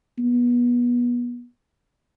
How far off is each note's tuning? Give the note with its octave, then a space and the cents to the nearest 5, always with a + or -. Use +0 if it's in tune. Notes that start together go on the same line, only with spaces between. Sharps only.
B3 -30